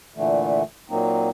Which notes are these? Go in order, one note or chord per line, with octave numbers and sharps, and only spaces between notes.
A#2 D3 E3 A3
A#2 F#3 A#3 C4 D#4